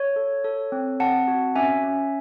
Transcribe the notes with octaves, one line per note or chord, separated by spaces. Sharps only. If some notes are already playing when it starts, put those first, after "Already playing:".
Already playing: C#5
A4
A4
C4
C4 F#5 A5
F#4
C#4 E5 G#5
C#4